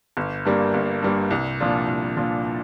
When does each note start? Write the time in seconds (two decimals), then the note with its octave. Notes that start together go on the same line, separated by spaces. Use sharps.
0.17 G1
0.45 G2 G3 A#3
0.74 G1
1.02 G2 G3 A#3
1.31 C2
1.60 A#2 F3 D4 F4
1.88 C2
2.16 A#2 F3 D4 F4